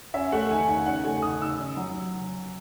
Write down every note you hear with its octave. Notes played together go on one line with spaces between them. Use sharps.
C#4 E5
A3 F#5
D#3 G#5
D#3 F#5
C#4 F#5
A3 G#5
D#3 D#6
D#3 E6
C#4
F#3